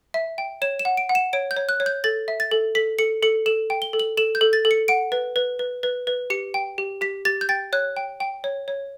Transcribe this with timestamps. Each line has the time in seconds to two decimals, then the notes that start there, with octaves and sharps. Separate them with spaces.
0.14 E5
0.38 G5
0.62 C#5 E7
0.79 E7
0.85 F#5
0.97 D7
1.09 F#5
1.15 E7
1.33 C#5 D7
1.51 G6
1.57 C#5
1.69 F#6
1.80 C#5
1.86 G6
2.04 A4 A6
2.28 E5
2.40 A6
2.51 A4
2.75 A4 B6
2.99 A4 C#7
3.23 A4 C#7
3.46 A4 E7
3.70 G5
3.82 G7
3.93 A4
3.99 F#7
4.17 A4 E7
4.35 G6
4.41 A4
4.53 A6
4.65 A4
4.71 C#7
4.88 F#5 D7
5.12 B4
5.36 B4
5.59 B4
5.83 B4
6.07 B4
6.30 G4 C#7
6.54 G5
6.78 G4
7.01 G4 B6
7.25 G4 A6
7.41 G6
7.49 G5 A6
7.73 C#5 F#6
7.97 G5
8.20 G5
8.44 C#5
8.68 C#5